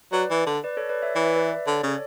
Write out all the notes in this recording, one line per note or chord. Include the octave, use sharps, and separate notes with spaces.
F#3 B4 D5
E3
D3
B4 D5
A4 C#5
B4 D5
C#5 E5
E3 D5
E5
B4 D5
D3 C#5
D5
C#3 A4 C#5